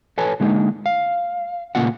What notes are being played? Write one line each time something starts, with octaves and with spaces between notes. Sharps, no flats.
A4 B4 C#5 G#5 A5
D3 G#3 A#3 C4 D#4
F5
A#2 C#3 A3 A#3 F4 F#5